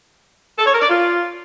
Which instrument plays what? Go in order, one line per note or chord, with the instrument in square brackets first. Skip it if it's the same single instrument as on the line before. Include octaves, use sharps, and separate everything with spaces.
[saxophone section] A4
C#5
A#4
D5
F4